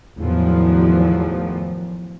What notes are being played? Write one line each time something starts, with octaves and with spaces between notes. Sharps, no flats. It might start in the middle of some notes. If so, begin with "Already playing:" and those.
E2 A2 D#3 F3 F#3